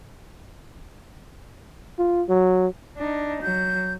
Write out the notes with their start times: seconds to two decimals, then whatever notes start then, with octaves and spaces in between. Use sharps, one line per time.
1.99 F4
2.29 F#3
2.97 D4 D#4
3.42 F#3 G6